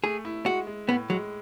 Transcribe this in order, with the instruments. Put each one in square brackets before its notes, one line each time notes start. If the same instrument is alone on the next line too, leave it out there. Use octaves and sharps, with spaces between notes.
[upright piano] A3 [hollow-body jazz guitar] G#4
[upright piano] E4
[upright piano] G#3 [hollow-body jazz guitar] F#4
[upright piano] G#3
[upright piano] A2 [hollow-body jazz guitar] B3
[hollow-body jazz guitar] F#3 [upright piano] G#3